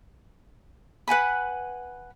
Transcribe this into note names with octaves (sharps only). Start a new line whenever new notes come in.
B4 F#5 G#5 B5